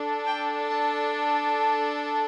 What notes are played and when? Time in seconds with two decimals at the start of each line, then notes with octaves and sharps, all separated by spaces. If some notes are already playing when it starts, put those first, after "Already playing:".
Already playing: D4 A4
0.26 G5
0.65 A5